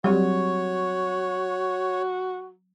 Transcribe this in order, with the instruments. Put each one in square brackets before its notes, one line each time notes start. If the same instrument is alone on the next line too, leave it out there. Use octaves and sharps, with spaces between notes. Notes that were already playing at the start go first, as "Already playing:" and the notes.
[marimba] F#3 C4 [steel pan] G3 [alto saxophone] F#4 [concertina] C#5